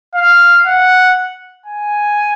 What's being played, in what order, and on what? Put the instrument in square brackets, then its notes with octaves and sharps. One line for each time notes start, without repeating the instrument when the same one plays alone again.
[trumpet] F5
F#5
G#5